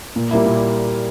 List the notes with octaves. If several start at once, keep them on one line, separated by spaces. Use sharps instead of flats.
A#2
G3 A#3 E4
A#2